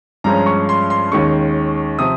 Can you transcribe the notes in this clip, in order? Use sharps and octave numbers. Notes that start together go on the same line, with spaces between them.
G2 F3 G#3 C#4 A#5
C#6
C6
C6
D#2 D#3 G#3 C#4 C#6
C3 F3 D#6